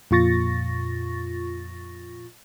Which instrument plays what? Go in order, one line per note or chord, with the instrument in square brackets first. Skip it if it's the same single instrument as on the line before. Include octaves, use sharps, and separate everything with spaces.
[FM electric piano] F2 A#2 F4 C#6 A6 A#6